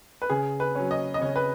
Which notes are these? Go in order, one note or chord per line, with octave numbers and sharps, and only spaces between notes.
B4
C#3 G#4
B4
F#3 C#4
D#5
D#5
C#3 C#5
B4